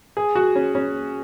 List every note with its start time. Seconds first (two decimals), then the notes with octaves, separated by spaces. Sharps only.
0.17 G#4
0.35 F#4
0.56 C#4
0.75 C#4